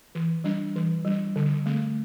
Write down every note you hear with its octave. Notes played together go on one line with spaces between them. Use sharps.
E3
G3 D4
E3
G3 D4
D3
A3 C4